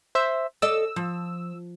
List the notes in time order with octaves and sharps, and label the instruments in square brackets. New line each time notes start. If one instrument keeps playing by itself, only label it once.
[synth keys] C5 E5
[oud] A4 D5 D#5 [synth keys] E6
[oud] F3